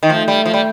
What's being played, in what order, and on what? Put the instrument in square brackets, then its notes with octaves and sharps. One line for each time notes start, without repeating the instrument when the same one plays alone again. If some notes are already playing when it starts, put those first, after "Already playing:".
[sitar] D#3
[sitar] F3 [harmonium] A3
[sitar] G3
F3
G3